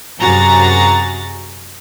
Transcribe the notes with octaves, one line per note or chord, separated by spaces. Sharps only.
F#2 C3 F#4 G#4 A#5 A6